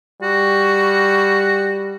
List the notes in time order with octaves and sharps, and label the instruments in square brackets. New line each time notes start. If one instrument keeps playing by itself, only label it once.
[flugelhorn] G3 [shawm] F#4